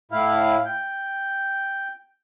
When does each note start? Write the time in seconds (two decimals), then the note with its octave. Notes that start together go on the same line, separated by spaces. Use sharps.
0.12 A2 E4 F5
0.65 G5